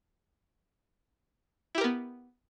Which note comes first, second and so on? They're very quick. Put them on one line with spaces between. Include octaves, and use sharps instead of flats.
E4 G4 A#4 B3